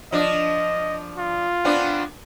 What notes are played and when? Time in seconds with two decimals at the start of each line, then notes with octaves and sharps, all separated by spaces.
0.12 F3 D4 D#5
1.18 F4
1.64 B3 C4 D4